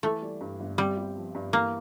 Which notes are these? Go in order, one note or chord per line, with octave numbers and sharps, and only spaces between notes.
E3 A3
G3
G2
G1
G3 C4
G4
F3
G2
E3 A#3